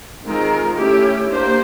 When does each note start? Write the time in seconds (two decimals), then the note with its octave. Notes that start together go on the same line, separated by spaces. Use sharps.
0.25 D#3 G#3 C4 F4 A#4
0.76 A3 C#4 E4 G4
1.28 A#3 D4 G4 C5